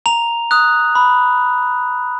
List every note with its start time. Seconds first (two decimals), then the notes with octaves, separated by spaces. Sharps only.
0.06 A#5 F7
0.51 D#6 F#6
0.95 B5